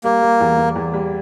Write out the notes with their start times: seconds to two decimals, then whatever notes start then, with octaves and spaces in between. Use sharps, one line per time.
0.04 G3 A#3
0.22 G3
0.41 E2
0.58 E2
0.76 E2
0.94 G3